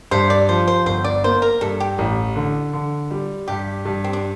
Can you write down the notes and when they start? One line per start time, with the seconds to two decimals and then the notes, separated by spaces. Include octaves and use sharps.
0.11 G2 C5
0.30 D5
0.49 F3 C5
0.67 C5
0.86 G1 C5
1.04 D5
1.24 A#3 C5
1.42 A#4
1.61 G2 A4
1.80 G4
1.98 A1
2.36 D3
2.73 D3
3.11 G3
3.48 G2 G4
3.85 G2
4.04 C4
4.13 D4